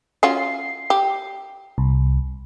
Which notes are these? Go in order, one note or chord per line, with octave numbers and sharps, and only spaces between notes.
C#4 F4 F#4 C7
G4
C2